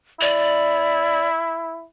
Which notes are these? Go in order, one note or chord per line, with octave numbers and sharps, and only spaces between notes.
E4 D5